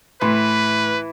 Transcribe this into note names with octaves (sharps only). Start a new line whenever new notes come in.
A2 E3 B4 C6